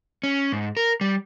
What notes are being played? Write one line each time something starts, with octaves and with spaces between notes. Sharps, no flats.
C#4
G#2
A#4
G3